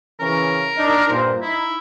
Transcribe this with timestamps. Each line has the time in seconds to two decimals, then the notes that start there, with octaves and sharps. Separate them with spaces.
0.20 C#3 E3 C#4 A#4
0.77 D4 D#4
1.10 G2 A#2 C5
1.42 D#4 E4